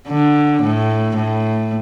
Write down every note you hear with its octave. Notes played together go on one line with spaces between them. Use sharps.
D3
A2
A2